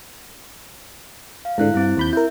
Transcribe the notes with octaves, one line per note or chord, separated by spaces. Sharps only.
F5
G#2 D3 E4 F#6
G2 C4 E4
D#2 B5 G6
E4 A#4 E5 G6